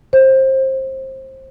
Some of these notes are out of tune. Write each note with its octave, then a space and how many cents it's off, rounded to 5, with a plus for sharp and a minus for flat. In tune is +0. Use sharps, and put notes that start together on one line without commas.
C5 +25